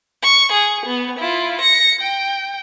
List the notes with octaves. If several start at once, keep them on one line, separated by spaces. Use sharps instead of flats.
C#6
G#4
B3
E4 F4
A#6 C#7
G5